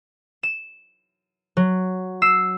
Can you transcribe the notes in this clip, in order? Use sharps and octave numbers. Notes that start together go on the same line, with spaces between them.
E7
F#3
E6 C7 E7